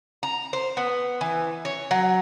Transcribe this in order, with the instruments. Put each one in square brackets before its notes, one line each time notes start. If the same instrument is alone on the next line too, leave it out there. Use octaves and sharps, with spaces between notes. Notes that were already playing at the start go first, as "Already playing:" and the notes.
[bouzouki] A#5
C5
B3
E3
C#5
F#3